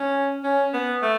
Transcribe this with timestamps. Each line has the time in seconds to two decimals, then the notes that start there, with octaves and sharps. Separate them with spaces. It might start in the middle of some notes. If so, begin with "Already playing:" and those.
Already playing: C#4
0.44 C#4
0.74 B3
1.02 A3